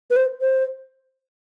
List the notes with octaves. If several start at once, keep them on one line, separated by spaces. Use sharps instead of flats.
B4
C5
C5